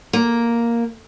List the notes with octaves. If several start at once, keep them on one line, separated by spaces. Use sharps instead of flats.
A#3